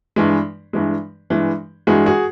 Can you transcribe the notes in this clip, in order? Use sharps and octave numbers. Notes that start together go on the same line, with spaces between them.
G2 E3 G#3
G2 E3 G#3
G2 E3 G#3
G2 E3 G#3 F#4 G#4
F#4 G#4